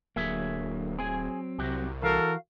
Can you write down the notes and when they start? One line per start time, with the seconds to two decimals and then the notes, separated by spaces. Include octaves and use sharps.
0.16 D1 D3 F#3 A#3 G#4 C#5 E5
0.99 F#3 C4 G#4 G#5
1.59 C2 C3 F#4 G4
2.03 E3 F#4 A4 A#4 F5